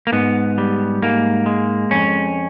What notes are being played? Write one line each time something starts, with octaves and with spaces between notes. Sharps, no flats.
A#3
G#2 B3
G3
G#2 A#3
G#3
F2 C#4